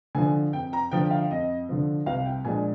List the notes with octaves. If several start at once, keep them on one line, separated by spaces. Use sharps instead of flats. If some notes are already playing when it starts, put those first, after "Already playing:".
D3 F3 G#5
F2 G5
A#5
D3 F3 G5
G5
F5
F2 D#5
D3 F3
C2 F5
G5
A#2 F3 G#3 D4 G#5